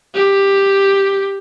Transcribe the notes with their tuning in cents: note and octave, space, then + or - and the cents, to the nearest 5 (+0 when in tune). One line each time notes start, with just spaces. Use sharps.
G4 +5